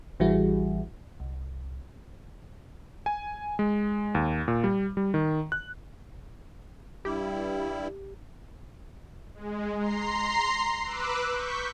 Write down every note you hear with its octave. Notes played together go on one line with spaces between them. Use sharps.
A1 E3 G3 E4 F#4 G#4
C2
G#5
G#3
D#2
A#2
G3
G3
D#3
F#6
G2 G3 E4 G4
G#3
A#5 C6 C7
B4 D6 E6 F#6
C#6 G6 B6